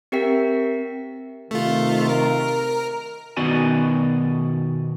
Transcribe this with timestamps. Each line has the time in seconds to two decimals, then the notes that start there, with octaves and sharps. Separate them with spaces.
0.12 C4 G4 A#4 E5 G5 B6
1.51 C3 D#3 A3 F4
2.09 A#4
3.37 B2 D#3 B3 F#4 D5 G#5